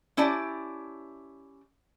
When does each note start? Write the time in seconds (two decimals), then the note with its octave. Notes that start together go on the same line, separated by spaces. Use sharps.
0.17 C#4 E4 G4 D5 A5